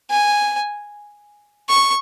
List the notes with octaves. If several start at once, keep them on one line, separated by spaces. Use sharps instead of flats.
G#5
C#6